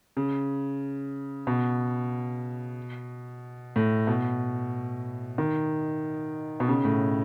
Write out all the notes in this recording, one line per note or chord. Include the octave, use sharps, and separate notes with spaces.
C#3
B2
A2
B2
D#3
B2
C#3
A2